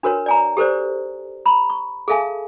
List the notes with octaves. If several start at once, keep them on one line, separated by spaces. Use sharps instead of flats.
D4 F#4 A#4 B4 C#5
D5 G#5 A#5
G4 A4 B4 C5 D5
A#5 B5
C#6
G#4 A4 E5 F5 G#5 A5